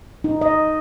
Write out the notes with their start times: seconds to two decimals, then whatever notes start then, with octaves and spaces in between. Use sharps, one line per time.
0.24 D#4
0.41 D#5